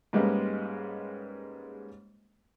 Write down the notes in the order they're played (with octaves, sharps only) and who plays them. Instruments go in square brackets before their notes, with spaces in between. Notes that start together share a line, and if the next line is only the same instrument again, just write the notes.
[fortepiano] G#2 G3 G#3 A#3 B3 C#4